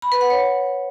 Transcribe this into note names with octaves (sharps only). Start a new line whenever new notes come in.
B5
B4
F#5
C#5